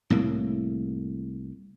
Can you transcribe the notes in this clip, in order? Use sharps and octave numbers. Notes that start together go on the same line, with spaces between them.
C2 A2 A#3